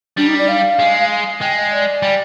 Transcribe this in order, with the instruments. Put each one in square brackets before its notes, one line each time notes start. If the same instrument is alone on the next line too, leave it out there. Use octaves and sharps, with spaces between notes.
[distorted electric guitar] G3 [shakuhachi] D4
[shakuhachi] D#4
D5
F5
[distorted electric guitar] G#3
[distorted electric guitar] G#3 [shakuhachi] G5
[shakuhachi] D#5
D5
[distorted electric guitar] G3